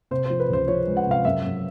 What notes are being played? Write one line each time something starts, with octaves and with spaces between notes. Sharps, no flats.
C3 C5
F3 C5
B4
C#2 C5
F3 C#5
G#3
F#5
C3
F5
F#2 E5
F#2